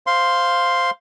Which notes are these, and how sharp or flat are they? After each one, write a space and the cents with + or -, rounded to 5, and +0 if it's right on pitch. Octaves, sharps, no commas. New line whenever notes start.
C5 +0 F5 +0 C6 +0